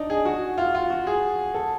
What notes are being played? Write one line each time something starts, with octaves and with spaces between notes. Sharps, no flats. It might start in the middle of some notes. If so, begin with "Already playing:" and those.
Already playing: D4 D#4
G#4
F#4
F4
F4
F#4
G#4
A4